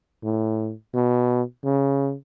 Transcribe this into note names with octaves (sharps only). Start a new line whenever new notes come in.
A2
B2
C#3